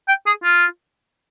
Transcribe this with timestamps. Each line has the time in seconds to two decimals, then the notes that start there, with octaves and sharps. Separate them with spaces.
0.08 G5
0.26 G#4
0.44 F4